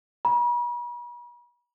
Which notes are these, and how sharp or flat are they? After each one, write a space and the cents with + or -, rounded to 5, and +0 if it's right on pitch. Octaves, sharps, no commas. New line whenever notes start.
B5 -45